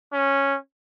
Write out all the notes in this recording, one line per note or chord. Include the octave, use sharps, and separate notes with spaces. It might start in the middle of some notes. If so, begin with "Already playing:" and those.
C#4